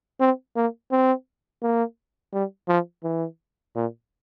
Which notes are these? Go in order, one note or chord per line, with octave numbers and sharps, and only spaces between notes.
C4
A#3
C4
A#3
G3
F3
E3
A#2